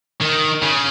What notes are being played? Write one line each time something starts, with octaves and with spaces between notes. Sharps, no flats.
D#3
C#3